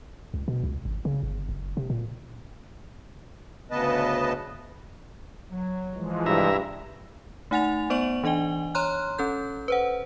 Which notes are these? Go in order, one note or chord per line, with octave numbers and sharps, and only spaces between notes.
C#2
B2
C#2
G#1
C#3
G1
F#1
C3
A#2
D2 C#3 B3 B4 D#5 A5
F#3
E3 F3 G#3
G2 C3 E4 E5 A#5
A3 D#4 F#5 G#5 A6 F7
B3 C5 D5 C#6 D7 F#7
E3 D4 D#5 G#5 G7
C#5 A#5 C6 F6 F#6
C#4 A4 G6
B4 C5 F#5